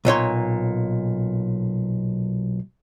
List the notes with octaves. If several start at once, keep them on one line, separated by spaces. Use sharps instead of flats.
B1 A#2 C#5 C6